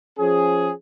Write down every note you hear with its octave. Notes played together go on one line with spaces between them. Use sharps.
F3 C#4 G#4